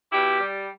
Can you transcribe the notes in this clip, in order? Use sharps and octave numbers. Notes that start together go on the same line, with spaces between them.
B2 E4 G4
G3